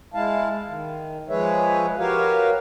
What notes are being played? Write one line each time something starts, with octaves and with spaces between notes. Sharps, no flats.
G#3 E4 F5 A5
D#3
F3 G#3 G#4 B4 C#5 E5
F#4 G4 A#4 B4 C#5 F5